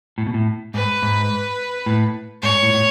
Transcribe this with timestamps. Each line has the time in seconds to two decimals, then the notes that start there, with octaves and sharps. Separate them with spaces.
0.18 A2
0.26 B2
0.34 A2
0.74 G#2 B4
1.02 G#2
1.86 A2
2.43 G#2 C#5
2.63 A2
2.74 A2